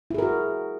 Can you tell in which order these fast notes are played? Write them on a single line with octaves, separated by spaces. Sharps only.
E4 G#4 A#4 F#4